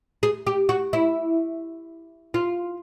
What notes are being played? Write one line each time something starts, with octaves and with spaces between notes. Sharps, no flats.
G#4
G4
F#4
E4
F4